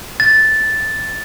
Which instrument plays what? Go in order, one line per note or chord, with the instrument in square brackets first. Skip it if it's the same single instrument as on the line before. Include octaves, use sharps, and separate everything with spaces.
[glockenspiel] A6